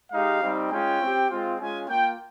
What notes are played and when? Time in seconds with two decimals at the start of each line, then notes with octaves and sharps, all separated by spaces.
0.12 G#3 D#4 G4 F5
0.41 G3 C4 D#4
0.71 G#3 C#4 F4 G5
1.01 C4 G4
1.30 G#3 C4 F4
1.59 G#3 C#4 F4 G#5
1.88 A#3 F4 G5